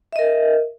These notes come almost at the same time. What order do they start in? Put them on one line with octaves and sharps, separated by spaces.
E5 D#5 A#4